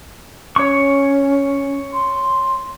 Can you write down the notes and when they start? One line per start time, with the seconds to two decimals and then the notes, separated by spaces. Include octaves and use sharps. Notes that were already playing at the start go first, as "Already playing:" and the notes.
0.56 C#4 C#5 C#6
1.93 C6